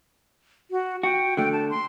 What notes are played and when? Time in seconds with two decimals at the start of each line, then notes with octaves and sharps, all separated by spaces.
0.71 F#4
1.03 F#4 G5
1.37 D3 A3 G5
1.52 A5
1.70 C6